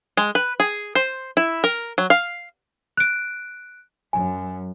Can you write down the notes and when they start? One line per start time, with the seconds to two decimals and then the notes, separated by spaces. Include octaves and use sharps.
0.17 G#3
0.35 B4
0.60 G#4
0.95 C5
1.37 E4
1.64 A#4
1.98 F#3
2.10 F5
2.97 F#6 D7
4.13 F#2 F#3 G#5